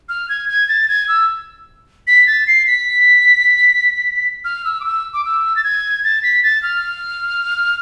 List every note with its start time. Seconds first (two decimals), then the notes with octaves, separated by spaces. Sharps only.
0.09 F6
0.29 G#6
0.49 G#6
0.68 A6
0.89 G#6
1.08 E6
2.07 B6
2.27 A6
2.47 C7
2.67 B6
4.45 F6
4.65 E6
4.81 D6
4.84 E6
5.14 D6
5.25 E6
5.56 A6
5.64 G#6
6.04 A6
6.23 B6
6.43 A6
6.63 F6